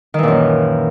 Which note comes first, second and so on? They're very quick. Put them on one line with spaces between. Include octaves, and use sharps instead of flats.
D#3 E3 A#2 F#2